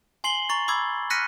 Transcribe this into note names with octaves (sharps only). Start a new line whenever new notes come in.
G#5 C6 C7 F#7 G7
A#5 C#6 A6
B5 D6 E6 G#6
F6 F#6 A#6 B6 C#7 D#7